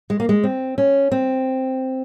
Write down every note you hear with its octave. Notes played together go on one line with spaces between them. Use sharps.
G#3
A#3
G#3
C4
C#4
C4